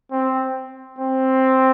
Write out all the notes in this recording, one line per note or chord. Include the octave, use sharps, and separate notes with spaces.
C4
C4